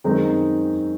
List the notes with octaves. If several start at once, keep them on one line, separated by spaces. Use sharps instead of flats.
F#2 D#3 G#3 C4 D#4